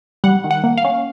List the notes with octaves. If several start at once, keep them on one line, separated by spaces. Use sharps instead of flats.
G3 F#5
D#3
F#5
A#3
F5
C#4